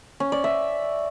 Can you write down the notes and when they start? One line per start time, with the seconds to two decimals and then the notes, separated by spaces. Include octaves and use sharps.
0.20 C#4
0.32 D5
0.44 E5